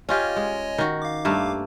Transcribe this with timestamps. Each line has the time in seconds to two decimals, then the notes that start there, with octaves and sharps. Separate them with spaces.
0.09 C#4 F4 G4 C#5 D#5 G#5
0.36 G#3
0.78 D#3 F#4
1.02 F5 D6
1.25 G2 A3 A#3